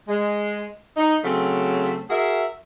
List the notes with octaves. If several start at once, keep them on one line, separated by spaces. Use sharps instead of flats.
G#3
D#4
C#3 F#3 A3 C4 C#4
F#4 G#4 A#4 E5